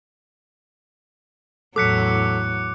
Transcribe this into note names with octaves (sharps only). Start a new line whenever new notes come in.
E2 A2 F#3 A4 D6 F#6 B6 C#7